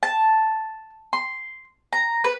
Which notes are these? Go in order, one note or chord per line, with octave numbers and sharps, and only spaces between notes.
A5
C6
A#5
B4